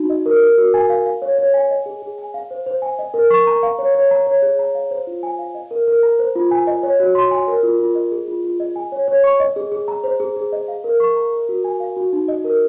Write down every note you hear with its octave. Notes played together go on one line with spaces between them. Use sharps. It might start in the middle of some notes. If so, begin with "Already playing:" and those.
Already playing: D#4 F#4
D#5
A#4
A#4
F#4
G#5
F5
F5
C#5
C#5
G#5
D#5
G#4
G#4
G#5
F5
C5
C5
G#5
D#5
A#4
C#6
A#5
F5
C#5
C#5
A#5
C#5
G#4
A#5
F5
C5
F4
G#5
F5
D#5
A#4
A#4
A#5
C5
F4
G#5
D#5
C#5
F#4
C6
G#5
A#4
F4
F4
D#5
G#4
F4
F4
D#5
G#5
C#5
C#5
C#6
D#5
G#4
G#4
A#5
C5
G#4
G#4
D#5
F5
A#4
C#6
A#5
A#4
F#4
G#5
F5
F#4
D#4
D#5
A#4